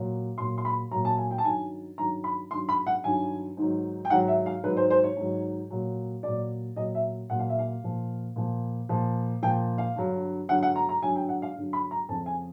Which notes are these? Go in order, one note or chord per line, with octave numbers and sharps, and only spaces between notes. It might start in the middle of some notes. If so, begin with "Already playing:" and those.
Already playing: A#2 F#3
A#2 F#3 C6
C6
B5
A#2 F#3 A#5
A5
G#5
G5
A5
G2 D#3 F#3 G#5
G2 D#3 F#3 A#5
B5
G2 D#3 F#3 C6
B5
F#5
G2 D#3 F#3 G#5
G#2 D#3 F#3
G5
G#2 D#3 F#3 F#5
E5
F5
G#2 D#3 F#3 B4
C5
C5
C#5
G#2 D#3 F#3
A#2 F#3
A#2 F#3 D5
A#2 F#3 D#5
E5
A#2 F#3 F#5
F5
E5
F5
A#2 F3
A#2 F3
A#2 F3
A#2 F3 G5
F5
G2 D3 F#3
G2 D3 F#3 F#5
F#5
A#5
A#5
G2 D3 F#3 G#5
G5
F#5
F5
G2 D3 F#3
B5
A#5
F2 C#3 F3 A5
G#5